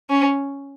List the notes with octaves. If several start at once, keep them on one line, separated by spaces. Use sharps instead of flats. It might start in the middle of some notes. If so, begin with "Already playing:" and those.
C#4